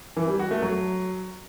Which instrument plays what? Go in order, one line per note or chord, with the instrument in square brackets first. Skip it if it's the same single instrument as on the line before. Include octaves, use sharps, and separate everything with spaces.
[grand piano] E3
G3
F#4
A3
F#3